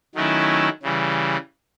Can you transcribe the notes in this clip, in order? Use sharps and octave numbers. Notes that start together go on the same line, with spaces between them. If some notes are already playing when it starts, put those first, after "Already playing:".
D#3 F#3 A3 C#4 E4
C#3 E3 G3